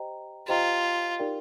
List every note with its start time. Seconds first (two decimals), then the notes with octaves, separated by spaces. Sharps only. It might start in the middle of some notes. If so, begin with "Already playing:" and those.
Already playing: G4 C5 D#5 G5 A#5
0.48 F4 G4 C5 D#5 G5 A#5
1.19 D#4 G4 A#4 D5 G5